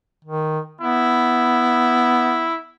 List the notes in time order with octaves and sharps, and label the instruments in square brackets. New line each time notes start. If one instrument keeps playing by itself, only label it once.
[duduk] D#3
[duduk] B3 [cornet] E4